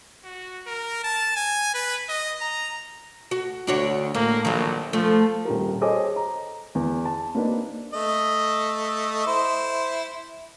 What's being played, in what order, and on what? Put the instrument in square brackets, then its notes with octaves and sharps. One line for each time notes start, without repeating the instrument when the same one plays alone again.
[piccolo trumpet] F#4
A#4
A5
G#5
B4
D#5
A#5
[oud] F#4
[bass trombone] D2 [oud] D4 F#4 C#5
[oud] A2 [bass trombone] A#3
[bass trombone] A#1 [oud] D#3 F#3
[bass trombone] F3 [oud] A3
[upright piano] D#1 F4 A#4
G#4 A4 C5 C#5 D#5 D6
A#5
E2
A5
A#3 C4 D4 D#4 B4
[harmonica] A3 D#5
E4 C5